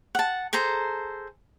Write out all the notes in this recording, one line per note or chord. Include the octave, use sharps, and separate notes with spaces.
F#5 A5
G#4 A4 C5 A#5